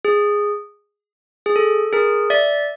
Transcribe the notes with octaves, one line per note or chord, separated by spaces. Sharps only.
G#4
G#4
A4
G#4 A#4
D5 E5